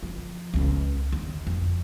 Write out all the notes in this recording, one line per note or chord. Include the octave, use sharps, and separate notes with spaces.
F3
C#2 C#4
D#2
F2